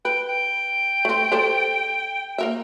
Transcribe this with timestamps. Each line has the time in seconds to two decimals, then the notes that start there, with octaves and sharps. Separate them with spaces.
0.05 B4 G5
0.29 G5
1.05 A3 C4
1.32 G4 A4 C5
2.38 A#3 A#4 E5